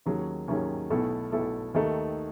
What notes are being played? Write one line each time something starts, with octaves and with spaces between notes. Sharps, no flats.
D#2 D#3 F#3 C#4 G#4
D#2 D#3 F#3 C#4 G#4
B1 B2 A3 E4 A4
B1 B2 A3 E4 A4
D#2 D#3 A3 D#4 A4